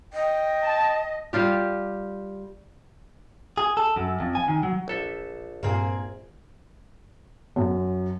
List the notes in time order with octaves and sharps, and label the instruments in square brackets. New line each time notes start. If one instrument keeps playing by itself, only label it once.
[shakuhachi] D#5 [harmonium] G5
[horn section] A5
[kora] G3 F4 G4
[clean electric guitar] G#4
A4
F#2
F2
G#5
D#3
F#3
[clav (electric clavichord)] A#1 A4 E5
[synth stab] G2 A#2 [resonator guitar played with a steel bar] A#3 C4 G#4
[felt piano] F#2